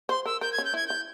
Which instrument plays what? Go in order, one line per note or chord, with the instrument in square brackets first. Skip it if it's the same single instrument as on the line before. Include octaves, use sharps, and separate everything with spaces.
[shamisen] C5 [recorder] C6
[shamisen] A#4 [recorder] E6
[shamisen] A#4 [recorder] G6
[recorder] G#6
[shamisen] C#4
[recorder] G6
[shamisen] E4 [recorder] G#6
[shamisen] E4 [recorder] G6